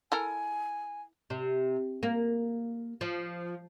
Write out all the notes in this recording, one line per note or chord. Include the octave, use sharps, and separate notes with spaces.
E4 A4 A#4 G#5
C3
A#3
F3